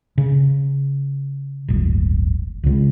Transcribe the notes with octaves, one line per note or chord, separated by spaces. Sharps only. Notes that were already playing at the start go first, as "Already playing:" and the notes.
C#3
D1 G1
C#2 C#3